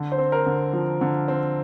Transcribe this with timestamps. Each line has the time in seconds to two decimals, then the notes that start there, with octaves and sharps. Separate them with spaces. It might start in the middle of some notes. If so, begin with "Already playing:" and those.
Already playing: D3
0.12 C5
0.18 C4
0.32 A#4
0.46 D3
0.73 F3
1.01 D3
1.28 C4